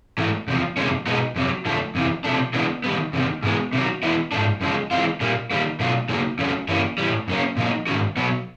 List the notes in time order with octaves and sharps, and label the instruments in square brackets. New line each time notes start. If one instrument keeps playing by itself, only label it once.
[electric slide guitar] G#2 E3 A3
E2 C3 F3
F2 C3 D#3 G#3 C#4
B2 G#3 B3 D#4
F2 C3 F#3
F2 D3 F3 A3
F2 C3 E3
C3 F3 A3 D4
C#3 E3 G#3 B3 D4
D#3 G3 B3
E2 C3 D#3
G#2 E3 G#3 B3
C3 D#3 F#3
E3 G#3 B3 E4
G#2 F3 A3 D4
F#2 C#3 F3 G#3
E3 G#3 C4 F4
A#2 G3 A#3
D#3 G3 A#3
B2 F#3 A3 D4 F4
C#3 F#3 A#3 D#4
F2 C#3 F#3 A3 C#4
G2 E3 G3 A#3 C#4
A2 E3 G3
F#2 C#3 F#3 A#3 C#4
A#2 F3 A#3 D#4
G#2 D#3 G#3 C#4 F#4
B2 F#3 B3